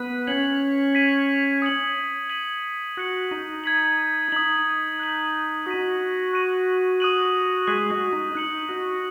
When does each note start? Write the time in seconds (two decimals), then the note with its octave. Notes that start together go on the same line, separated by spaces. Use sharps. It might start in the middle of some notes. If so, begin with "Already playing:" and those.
Already playing: B3 B4
0.27 C#4 C#5 G#6 B6 F#7
0.95 G#6 B6 D#7
1.62 D#6 G#6 C#7 F#7
2.29 G#6 B6 D#7 F#7
2.97 F#4 F#6 C#7 F#7
3.31 D#4
3.64 G#6 B6 F#7
4.32 D#4 D#6 B6 F#7
4.99 F#6 B6 F#7
5.66 F#4 D#6 B6 D#7
6.33 C#6 F#6 D#7
7.00 D#6 F#6 D#7 F#7
7.67 G#3 G#4 F#6 B6 D#7 F#7
7.90 F#4
8.13 D#4
8.35 D#4 F#6 C#7 F#7
8.69 F#4